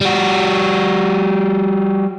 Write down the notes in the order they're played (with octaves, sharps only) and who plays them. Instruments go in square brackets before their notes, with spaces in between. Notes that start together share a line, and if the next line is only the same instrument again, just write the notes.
[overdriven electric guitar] G3 F#4